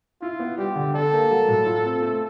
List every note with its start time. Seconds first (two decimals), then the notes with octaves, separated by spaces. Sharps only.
0.22 E4 F4
0.40 B3
0.58 G3 G4
0.76 D3
0.94 D4 A4
1.13 A#3
1.31 F#3
1.48 A2
1.66 F4
1.85 C4
2.02 A3